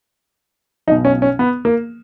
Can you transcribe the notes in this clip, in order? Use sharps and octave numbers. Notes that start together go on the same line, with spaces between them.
B1 B2 D#4
C#4
C#4
B3
A#3